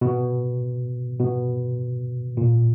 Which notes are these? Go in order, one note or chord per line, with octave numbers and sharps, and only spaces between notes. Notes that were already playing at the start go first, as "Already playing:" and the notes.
B2
B2
A#2